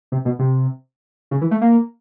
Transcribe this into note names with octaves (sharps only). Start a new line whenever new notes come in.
C3
B2
C3
C#3
E3
A3
A#3